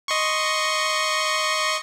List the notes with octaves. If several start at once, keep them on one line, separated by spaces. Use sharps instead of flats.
D#5 C6 C#6